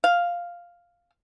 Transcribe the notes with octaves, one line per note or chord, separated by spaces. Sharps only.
F5